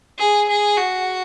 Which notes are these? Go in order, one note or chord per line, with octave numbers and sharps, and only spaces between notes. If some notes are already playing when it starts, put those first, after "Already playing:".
G#4
G#4
F#4